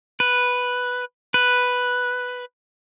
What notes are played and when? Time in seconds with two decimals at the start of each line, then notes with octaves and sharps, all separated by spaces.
0.20 B4
1.34 B4